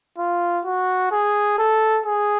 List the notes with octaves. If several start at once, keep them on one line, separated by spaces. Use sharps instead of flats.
F4
F#4
G#4
A4
G#4